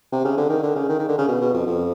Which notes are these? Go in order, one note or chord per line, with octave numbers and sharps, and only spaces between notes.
C3
C#3
D3
D#3
D3
C#3
D#3
D#3
D3
C#3
B2
B2
F2
F2